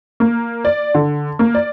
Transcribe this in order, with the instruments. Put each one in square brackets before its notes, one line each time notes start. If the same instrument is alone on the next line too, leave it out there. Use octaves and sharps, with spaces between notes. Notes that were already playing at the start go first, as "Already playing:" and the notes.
[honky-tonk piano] A#3
D5
D3
A#3
D5